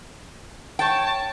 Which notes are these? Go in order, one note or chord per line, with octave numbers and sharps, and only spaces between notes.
C#5 G5 A5